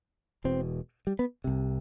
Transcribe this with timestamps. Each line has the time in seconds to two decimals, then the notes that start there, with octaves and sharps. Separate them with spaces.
0.44 E1 E2 B2 C4
1.07 G3
1.19 B3
1.44 C2 C3